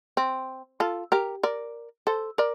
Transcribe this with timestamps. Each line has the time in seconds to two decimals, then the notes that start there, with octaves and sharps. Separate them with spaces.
0.17 C4
0.80 F4 A4
1.12 G4 A#4
1.43 A#4 D5
2.07 A4 C5
2.38 A#4 D5